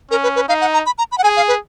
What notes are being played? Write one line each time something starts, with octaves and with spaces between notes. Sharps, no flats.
C#4 A#4
B4
B4
D#4 F5
F#5
A#5
B5
A#5
B5
F#5
G#4 G#5
F5
B4